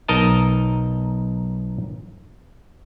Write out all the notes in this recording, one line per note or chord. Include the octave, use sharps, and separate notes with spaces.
B1 D#4 A#4 D#5 A5